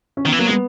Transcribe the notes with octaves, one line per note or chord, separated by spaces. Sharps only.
C#4
D#3
E3 B3
F#3 A#3
G#3 B3